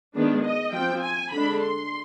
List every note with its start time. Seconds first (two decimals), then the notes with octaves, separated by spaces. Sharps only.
0.15 D#3 G#3 B3 D4
0.44 D#5
0.73 F3 C4 G5
1.03 G#5
1.32 D3 G#3 D4 B5
1.62 C6